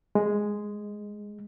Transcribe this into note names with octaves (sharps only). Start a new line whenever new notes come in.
G#3